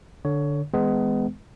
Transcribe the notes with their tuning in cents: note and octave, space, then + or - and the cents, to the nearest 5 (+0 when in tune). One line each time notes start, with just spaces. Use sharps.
D3 +0 C#5 +15
E3 -45 G#3 +0 B3 +25